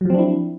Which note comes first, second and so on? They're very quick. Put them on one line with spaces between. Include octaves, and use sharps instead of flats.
F#3 F3 C4 D4 E4